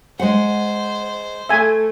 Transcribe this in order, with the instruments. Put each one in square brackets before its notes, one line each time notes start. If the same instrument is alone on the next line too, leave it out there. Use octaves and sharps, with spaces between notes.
[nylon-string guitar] G#3 F#5 [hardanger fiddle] C5
[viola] A3 [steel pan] E5 G#5